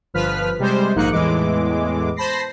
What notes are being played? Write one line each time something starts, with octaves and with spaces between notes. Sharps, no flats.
G1 F3 B4 F6 B6
C3 G3 G#3 C5
A#1 G#2 A#3 D#4 F#6 C#7
E2 A2 E3 G#3 D6
C5 A5 B5 A#6 C7